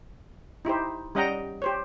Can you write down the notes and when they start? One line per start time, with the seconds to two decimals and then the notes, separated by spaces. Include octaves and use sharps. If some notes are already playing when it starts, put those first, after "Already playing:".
0.65 D#4 E4 G4 C5
1.15 G3 C#4 D#5 F#5 G5 A#5
1.62 G4 C5 C#5